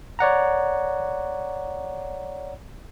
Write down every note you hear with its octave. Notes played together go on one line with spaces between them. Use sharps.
C#5 D5 F#5 A#5